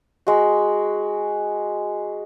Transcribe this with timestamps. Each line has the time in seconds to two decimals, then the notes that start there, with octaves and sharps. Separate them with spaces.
0.27 G#3 F#4